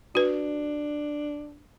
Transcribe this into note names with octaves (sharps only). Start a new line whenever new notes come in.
D4 F#4 B4